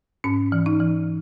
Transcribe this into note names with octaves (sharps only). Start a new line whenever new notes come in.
G#2 C#4
E3
D#4
E3